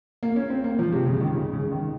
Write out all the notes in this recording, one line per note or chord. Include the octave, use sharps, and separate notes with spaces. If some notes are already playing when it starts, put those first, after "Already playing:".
A#3
C#4
C4
A#3
F3
C3
C#3
D#3
C#3
C#3
D#3